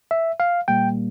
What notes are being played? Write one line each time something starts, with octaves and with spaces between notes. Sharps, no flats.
E5
F5
A#2 G3 A#3 G5